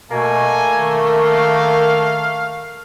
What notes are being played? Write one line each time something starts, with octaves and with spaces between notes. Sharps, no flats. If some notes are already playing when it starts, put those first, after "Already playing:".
B2 A3 A#3 G#5
D#3
F5